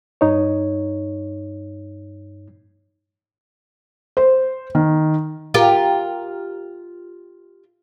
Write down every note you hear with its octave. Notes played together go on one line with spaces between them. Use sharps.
G2 D#4 C#5
C5
D#3
F4 G4 A#4